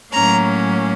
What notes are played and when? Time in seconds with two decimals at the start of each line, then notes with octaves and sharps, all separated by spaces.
0.11 A2 F#3 A#3 C#4 A#5